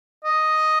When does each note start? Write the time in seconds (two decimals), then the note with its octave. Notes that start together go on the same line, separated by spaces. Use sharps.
0.25 D#5